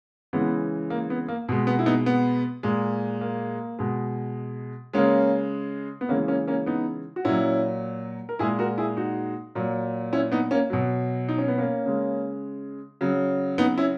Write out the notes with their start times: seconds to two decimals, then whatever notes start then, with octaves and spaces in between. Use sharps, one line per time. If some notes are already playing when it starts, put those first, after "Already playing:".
0.33 C#3 E3 G#3 B3
0.90 A#3
1.10 B3
1.28 A#3
1.49 B2 G#3
1.67 B3
1.79 E4
1.86 B3 D#4
2.06 B3
2.63 A#2 G#3
3.21 A#3
3.79 B2 G#3
4.93 C#3 G#3 A#3 C#4
6.01 B3
6.09 C#3 E3 G#3 A#3 C#4
6.28 A#3 C#4
6.47 A#3 C#4
6.66 B3 D#4
7.16 F#4
7.25 A#2 F#3 C#4 E4
8.29 A#4
8.39 A#2 G#3 E4 G#4
8.59 F#4 A#4
8.78 E4 G#4
8.97 D#4 F#4
9.55 A#2 F#3
10.13 C#4 E4
10.32 B3 D#4
10.51 A#3 C#4
10.70 B2 F#3
11.29 D#4
11.38 C#4
11.48 B3
11.58 A#3 C#4
11.86 C#3 G#3
13.01 C#3 F#3
13.58 B3 D#4
13.78 C#4 E4